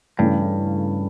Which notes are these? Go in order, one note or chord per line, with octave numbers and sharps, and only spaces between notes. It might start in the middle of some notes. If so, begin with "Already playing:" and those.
G2 C#3 E3 A3 C#4